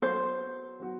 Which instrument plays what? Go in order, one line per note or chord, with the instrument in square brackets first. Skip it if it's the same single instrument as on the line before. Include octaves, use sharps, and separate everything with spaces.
[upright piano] F#3 B3 F#4 [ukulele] C5
[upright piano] F#3 B3 F#4